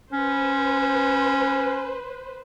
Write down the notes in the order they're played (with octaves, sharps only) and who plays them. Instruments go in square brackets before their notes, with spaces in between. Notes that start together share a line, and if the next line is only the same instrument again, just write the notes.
[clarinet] C#4 [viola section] B4 C5